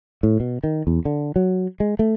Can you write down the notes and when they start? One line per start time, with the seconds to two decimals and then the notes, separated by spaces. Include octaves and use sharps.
0.23 A2
0.40 B2
0.64 D#3
0.87 E2
1.05 D3
1.36 F#3
1.80 G#3
1.99 A3